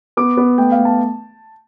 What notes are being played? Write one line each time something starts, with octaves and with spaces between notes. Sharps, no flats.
B3 D6
B3
A3 G5
F5
A3
A5